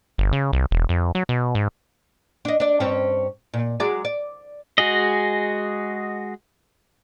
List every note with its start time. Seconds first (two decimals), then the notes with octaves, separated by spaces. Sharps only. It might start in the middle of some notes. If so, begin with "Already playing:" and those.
0.18 G1
0.32 C#3
0.53 C2
0.71 E1
0.89 F2
1.15 F#3
1.29 B2
1.55 G#2
2.45 D4 D#5
2.60 D4 D5
2.80 G2 C4 C#4
3.54 A#2
3.80 F#3 G#3 D5
4.05 D5
4.78 G#3 F#4 G#4 D#5